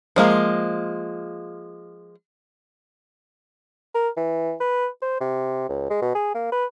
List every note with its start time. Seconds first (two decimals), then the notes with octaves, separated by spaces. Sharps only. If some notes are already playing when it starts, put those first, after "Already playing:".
0.16 F3 G#3 A#3
3.94 A#4
4.17 E3
4.60 B4
5.02 C5
5.20 C3
5.69 C#2
5.90 G#3
6.02 B2
6.15 G#4
6.34 A#3
6.52 B4